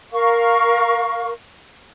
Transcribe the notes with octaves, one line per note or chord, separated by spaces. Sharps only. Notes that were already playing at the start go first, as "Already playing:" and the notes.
A#4 F5 C#6